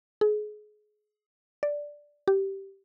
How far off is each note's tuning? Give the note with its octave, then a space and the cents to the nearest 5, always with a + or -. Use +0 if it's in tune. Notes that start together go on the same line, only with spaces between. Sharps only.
G#4 +30
D5 -5
G4 -10